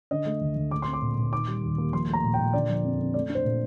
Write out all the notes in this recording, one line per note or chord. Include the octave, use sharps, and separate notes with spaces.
D3 D#5
A3
D2
D2
A3 D6
C4 C6
D6
A#2
A#2
D#3 D6
G3
D#2
A#3
F3 C6
A3
A#5
A#2
G5
A#2
D3 D5
F3
F2
F2
A3 D5
D4
C5
A#2